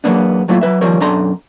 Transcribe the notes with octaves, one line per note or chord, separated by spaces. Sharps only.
E2 D#3 F#3 A#3 B3 D4
A2 F#3 A3 A#3 E4 F4
F#3 B4 E5
D#2 F3 G3 A#4 C#5
F#2 B2 D4 A4 A#5 C6